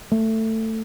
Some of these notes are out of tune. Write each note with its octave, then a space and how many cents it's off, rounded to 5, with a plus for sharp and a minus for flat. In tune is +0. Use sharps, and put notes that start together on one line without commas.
A3 +15